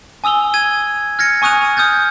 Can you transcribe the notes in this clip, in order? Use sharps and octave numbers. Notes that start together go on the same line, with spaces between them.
G#5 D#6 E6 F7 G7
G#6 D#7
F6 G#6 A#6 C#7
G#5 C#6 D#6 F#6 D#7 F7
D#6 F6 G6 A6